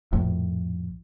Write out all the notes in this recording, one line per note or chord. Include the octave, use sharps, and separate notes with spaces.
A#1 F2 A2